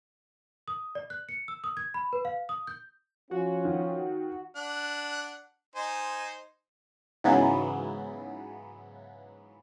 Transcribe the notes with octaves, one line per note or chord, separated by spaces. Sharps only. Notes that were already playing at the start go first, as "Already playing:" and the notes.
D#6
D5
F#6
C#7
E6
D#6
G#6
B5
B4
F5
D#6
G6
F3 C#4 F4 F#4
D#3
D4 F#5
D#4 C5 G#5
G#2 C#3 E3 F#3 B3